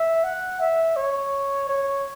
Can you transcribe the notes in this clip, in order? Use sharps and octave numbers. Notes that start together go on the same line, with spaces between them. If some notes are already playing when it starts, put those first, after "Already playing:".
Already playing: E5
F#5
E5
C#5
C#5